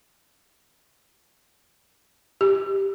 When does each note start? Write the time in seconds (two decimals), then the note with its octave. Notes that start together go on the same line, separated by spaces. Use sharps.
2.41 G4